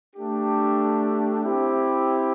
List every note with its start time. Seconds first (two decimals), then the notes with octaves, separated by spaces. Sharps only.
0.15 A3 D4 G4
1.42 C4 E4 G4